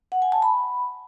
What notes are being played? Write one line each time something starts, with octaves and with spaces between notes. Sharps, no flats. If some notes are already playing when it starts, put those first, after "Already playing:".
F#5
G#5
A5
B5